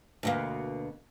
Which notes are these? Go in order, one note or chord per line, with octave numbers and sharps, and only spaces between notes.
D2 B2 A#3